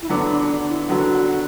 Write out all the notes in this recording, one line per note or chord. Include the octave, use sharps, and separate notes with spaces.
E4
D3 F#3 B3 D4
D4
D4
E4
D3 F#3 B3 F#4